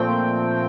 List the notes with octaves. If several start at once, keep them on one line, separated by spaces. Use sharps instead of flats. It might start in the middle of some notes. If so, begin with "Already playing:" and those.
Already playing: A#2 F3 A3 C4 G5